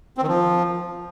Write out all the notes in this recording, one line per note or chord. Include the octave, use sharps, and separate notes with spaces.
C4
D#3
F3